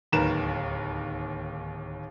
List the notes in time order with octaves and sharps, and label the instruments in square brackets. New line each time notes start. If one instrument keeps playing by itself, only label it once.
[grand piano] D1 D#2 D#3 A#4 B4 E7